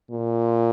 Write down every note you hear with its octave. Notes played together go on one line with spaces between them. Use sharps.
A#2